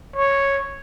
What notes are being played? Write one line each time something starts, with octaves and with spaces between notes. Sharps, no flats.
C#5